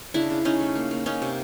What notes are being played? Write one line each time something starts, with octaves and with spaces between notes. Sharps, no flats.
C#3 D4 E4
C#3
C#3 C#4 D#4
A3
A#3
A#3
A#3 C#4 D#4
C3